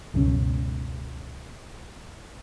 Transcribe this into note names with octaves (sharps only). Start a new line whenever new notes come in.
C#2 F#2 B2 C#4